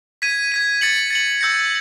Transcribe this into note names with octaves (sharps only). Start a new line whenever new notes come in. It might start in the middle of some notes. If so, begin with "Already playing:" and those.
G#6 B6 D#7
G#6 B6 D#7
A6 C#7 F#7
A6 C#7 F#7
E6 G6 A#6 C#7